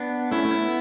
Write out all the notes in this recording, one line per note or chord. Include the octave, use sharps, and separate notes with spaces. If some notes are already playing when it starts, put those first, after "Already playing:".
Already playing: B3 D4
A3 C#4 E4
A3
C#4
B3